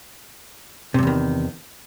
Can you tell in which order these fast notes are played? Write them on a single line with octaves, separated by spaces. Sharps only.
C3 G2 E2 D#3